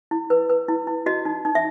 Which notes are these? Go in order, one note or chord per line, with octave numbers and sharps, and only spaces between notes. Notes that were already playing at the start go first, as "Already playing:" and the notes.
E4
B4
B4
E4
E4
F#4 D#5
D#4
D#4
E5